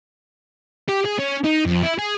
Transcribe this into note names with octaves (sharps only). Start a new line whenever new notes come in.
G4
G#4
C#4
D#4
F2
E4
G#4